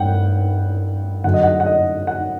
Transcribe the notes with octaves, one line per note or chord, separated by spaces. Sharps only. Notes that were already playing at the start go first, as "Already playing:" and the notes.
Already playing: G2 F#5 G5
F#2 D3 F#3 F#5
D#5
F#5
F#5
D#5
F#5